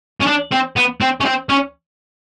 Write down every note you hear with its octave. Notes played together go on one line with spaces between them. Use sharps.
C#4
D4
C4
B3
C4
C#4
C4
C#4